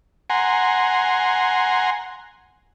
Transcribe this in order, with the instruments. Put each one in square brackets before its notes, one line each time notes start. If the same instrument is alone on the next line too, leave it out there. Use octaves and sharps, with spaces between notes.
[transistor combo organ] F#5 G#5 A#5 C6